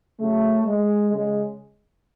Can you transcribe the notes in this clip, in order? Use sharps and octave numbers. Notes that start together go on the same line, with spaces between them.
C#3 F#3 A3
G#3
C#3 G#3